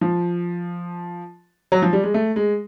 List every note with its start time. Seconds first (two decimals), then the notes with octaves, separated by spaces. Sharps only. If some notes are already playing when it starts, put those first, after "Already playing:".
0.01 F3
1.72 F#3
1.82 F3
1.93 G3
2.03 G#3
2.14 A3
2.36 G#3